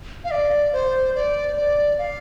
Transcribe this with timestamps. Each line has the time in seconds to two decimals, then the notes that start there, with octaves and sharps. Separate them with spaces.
0.24 F5
0.31 D5
0.73 C5
1.15 D5
1.57 D5
1.99 F5